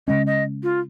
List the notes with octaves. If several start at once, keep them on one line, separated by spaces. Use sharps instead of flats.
C#3 G#3 C#4 D#5
D#5
F4